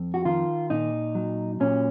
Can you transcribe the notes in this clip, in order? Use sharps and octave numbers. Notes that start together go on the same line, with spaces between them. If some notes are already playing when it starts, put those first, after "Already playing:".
Already playing: F2
F#4
D#3 F4
A#2 D#4
F#3
A#2 C#4